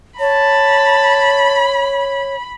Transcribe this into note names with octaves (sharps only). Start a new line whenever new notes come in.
C#5 A5 B5